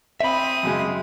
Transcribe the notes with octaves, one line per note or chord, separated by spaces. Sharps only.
C4 E5 B5 D#6
F#2 C#3 G#3